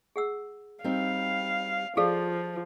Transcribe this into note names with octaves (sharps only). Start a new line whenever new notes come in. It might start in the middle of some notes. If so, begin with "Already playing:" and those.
G#4 F#5 E6
G3 C4 D#4 F5
F3 F4 G#4 A4 D5 F5